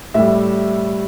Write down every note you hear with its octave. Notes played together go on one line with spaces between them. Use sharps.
A2 G3 E5